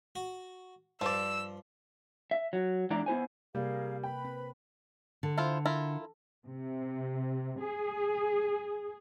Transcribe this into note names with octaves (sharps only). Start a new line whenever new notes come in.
F#4
G2 F3 D5 E6
E5
F#3
E2 G#3 D4 E4 D5 A#5
B3 E4 C5 G#5
C3 G3 A#3 G#4 A#4 F5
B4 G5 B5
C4
D3
E4 F4 C5
E4 F4 A#4
C3
G#4